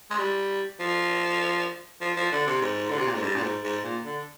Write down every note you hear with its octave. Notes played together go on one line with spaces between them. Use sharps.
G#3
G3
F3
F3
F3
D3
C3
G#2
D3
C3
A#2
G#2
G2
A#2
G#2
G#2
A#2
D3